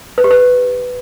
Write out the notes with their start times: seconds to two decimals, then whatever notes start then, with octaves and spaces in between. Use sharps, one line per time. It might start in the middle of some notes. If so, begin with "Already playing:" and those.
0.18 B4
0.24 G4
0.31 B4